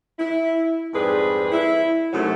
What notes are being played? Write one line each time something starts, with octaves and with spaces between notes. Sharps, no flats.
E4
F2 G#2 G3 G#4 B4
E4
F#2 C3 F#3 A3 D#4